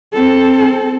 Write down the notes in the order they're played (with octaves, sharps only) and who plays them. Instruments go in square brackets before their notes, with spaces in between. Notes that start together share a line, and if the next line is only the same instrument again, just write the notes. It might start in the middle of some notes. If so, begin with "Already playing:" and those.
[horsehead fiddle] C4 A4